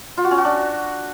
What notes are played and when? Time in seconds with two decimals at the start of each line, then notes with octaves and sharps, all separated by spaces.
0.18 F4
0.24 F#4
0.31 C#4
0.38 F#4
0.44 D4